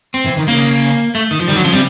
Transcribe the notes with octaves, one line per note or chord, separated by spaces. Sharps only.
C4
E3
D#3
C#3 A#3
A3
D#3
F3
D#3 G3
D3 F#3
C#3 F3
C3 G3